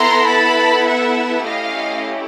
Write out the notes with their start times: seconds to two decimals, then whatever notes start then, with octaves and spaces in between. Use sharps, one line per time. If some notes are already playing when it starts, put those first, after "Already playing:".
Already playing: B3 E4 A4 A#5 C6
0.26 A5 B5
0.85 E5 F#5
1.45 A3 C#4 E4 G4 D#5 F5